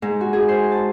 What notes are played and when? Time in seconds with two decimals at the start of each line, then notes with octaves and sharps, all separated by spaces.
0.02 G#2
0.21 F#4
0.33 G#4
0.48 C5
0.72 A5